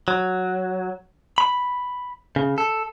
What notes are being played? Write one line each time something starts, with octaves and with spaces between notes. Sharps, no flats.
F#3
B5
C#3
A4